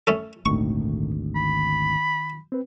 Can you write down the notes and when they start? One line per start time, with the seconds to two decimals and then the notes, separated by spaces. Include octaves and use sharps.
0.07 A3 C#4 A4
0.46 G#1 D2 A#2 D#3 A3 C#6
1.36 D#3 B5
2.52 C4 B4